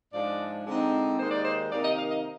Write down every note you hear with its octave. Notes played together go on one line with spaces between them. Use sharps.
G#2 F3 G#3 D4 D5
D3 G#3 C4 D#4
D#2 D#3 G#3 D#4 C5
D5
C5
C3 D#3 A#3 D#4 D5
D#5
F5
D#5